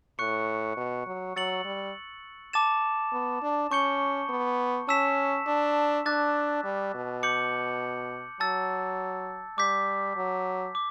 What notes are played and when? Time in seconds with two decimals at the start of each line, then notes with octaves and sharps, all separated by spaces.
0.19 A2 C#6 F#6 C#7
0.77 B2
1.06 F#3
1.36 F#3 E6 A6 C#7 F#7
1.65 G3
2.53 A5 D6 A6 E7
3.12 B3
3.42 D4
3.71 C#4 C#6 G6 C#7 G7
4.29 B3
4.88 C#4 A5 E6 B6 E7
5.47 D4
6.06 D4 D6 F#6 A6
6.64 G3
6.94 B2
7.23 D6 G6 C#7 F#7
8.40 F#3 A5 E6 A6
9.58 G3 D6 G6 B6
10.16 F#3
10.75 D6